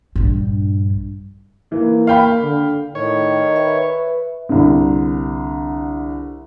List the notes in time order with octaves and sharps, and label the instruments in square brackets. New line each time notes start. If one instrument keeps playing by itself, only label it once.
[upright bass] A#1 G2
[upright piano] E3 [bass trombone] A#3
[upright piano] F5 G5 B5
[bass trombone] D3
[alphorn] A2 [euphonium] D#3 [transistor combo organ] C#5
[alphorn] B4 [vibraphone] E5
[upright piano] C2 D3